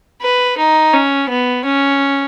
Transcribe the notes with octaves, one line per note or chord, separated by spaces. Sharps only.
B4
D#4
C#4
B3
C#4